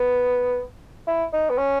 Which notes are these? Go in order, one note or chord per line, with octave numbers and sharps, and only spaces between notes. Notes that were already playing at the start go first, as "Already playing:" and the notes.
Already playing: B3
E4
D#4
B3
C#4